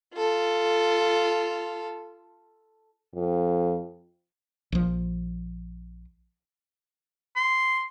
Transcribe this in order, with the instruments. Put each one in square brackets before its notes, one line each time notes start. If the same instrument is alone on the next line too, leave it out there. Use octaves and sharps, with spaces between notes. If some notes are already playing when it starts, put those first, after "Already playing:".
[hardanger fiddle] F4 A4
[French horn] F2
[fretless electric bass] A#1 F3
[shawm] C6